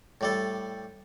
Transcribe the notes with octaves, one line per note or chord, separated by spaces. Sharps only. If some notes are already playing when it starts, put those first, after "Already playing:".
A2 G3 A4